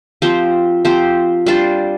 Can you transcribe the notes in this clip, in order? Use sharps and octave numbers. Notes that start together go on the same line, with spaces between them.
F3 C4 G4 C5
F3 C4 G4 C5
G3 D4 F4 C5